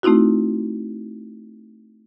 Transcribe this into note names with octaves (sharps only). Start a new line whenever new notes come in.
A3 C4 D#4 E4 F#4